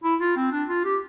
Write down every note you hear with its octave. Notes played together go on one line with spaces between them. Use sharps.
E4
F4
C4
D4
F4
G4